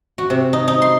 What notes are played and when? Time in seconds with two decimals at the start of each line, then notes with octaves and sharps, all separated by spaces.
0.18 F#4
0.30 C3
0.53 D#4
0.68 D#4
0.82 C6